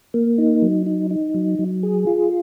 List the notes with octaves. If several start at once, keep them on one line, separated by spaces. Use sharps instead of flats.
A#3
D#4
F#3
D#4
D#4
F#3
F#3
G#4
F4